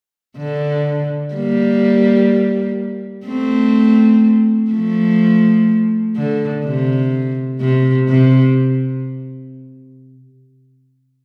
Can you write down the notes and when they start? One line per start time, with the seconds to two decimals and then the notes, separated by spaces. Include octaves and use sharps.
0.37 D3
1.34 G3 A#3
3.26 A3 C4
4.71 F3 A3
6.16 D3
6.65 C3
7.60 C3
8.09 C3